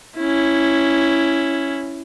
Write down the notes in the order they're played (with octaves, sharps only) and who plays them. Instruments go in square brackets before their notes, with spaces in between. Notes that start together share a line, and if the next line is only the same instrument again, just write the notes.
[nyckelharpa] C#4 E4